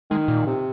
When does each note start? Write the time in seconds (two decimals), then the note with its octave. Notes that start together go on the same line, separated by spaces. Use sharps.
0.10 D#3 G#3
0.28 A#2
0.47 C3